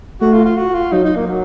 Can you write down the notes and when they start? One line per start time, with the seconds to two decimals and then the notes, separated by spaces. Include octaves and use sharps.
0.21 A3 F#4
0.33 F4
0.45 F4
0.56 F#4
0.74 F4
0.92 F#3 D#4
1.04 D#4
1.16 A#3
1.27 F#3